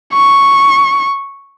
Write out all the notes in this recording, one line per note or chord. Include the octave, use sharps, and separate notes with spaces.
C#6